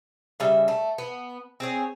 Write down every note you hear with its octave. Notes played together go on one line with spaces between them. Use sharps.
C#3 G3 E5
A3
B3
C4 G#4 C#5